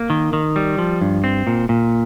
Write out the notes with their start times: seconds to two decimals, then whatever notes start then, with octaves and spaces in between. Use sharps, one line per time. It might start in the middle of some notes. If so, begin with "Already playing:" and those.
Already playing: A#3
0.10 D#3
0.33 D#3
0.56 G3
0.78 F3
1.01 G2
1.24 C4
1.47 A#2
1.69 A#2